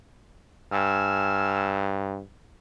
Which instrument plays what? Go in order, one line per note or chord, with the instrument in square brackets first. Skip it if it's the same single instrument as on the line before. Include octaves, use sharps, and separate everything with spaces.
[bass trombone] G2 [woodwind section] G#5 E6 F6